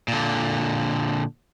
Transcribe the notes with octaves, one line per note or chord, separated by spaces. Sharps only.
A#2 D3